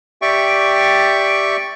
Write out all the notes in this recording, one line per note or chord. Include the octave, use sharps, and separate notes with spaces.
G4 D5 E5 G5 C#6